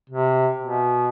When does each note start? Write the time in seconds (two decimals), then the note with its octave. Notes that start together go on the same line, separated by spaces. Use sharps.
0.10 C3
0.63 B2